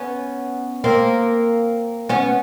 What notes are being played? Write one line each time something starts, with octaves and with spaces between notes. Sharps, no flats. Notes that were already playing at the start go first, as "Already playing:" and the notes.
Already playing: B3 C#4
A#3 C4
B3 C#4